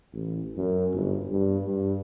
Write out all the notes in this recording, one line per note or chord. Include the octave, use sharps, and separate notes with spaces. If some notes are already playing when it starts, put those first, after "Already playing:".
A1
F#2
G1
G2
G2